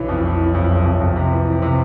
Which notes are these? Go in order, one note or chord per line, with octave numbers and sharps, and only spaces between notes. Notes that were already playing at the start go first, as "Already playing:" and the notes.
Already playing: B1 E3
F2
E3
E3
F2
F#1
F2
F2
C3
E3
E3
C3